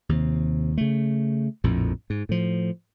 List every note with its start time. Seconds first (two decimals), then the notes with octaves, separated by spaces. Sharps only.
0.09 D#2 C3
0.78 C#3 A3
1.64 A#1 F2 A2
2.10 G#2
2.29 A2 F3